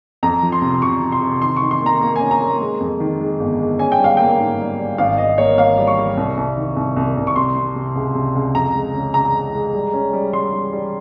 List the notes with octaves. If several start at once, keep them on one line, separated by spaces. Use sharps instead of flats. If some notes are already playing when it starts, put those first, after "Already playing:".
F2 A#5
F3
C6
C3
C3 C#6
C3
C6
C3
D#3 C6
D#3 C#6
C6
A#3 A#5
A#3
G#5
C#4
A#5
A#3
G#3
F2
D#3
G#3
G1
G#3
C#4 G#5
G5
G3 F5
A#3 G5
G#2
G3
G3
G#1 F5
G#1 D#5
A#3 C#5
A#3 F5
G3
C#6
G3
C2
C2
D#3
C2
C2
C2
C#6
C3 C6
C3
C3
C#2
C3
C#2
F2 A#5
G#3
C#3
C#3 A#5
G#3
G#3
G3
C#4
G3
G3 C6
G3
G3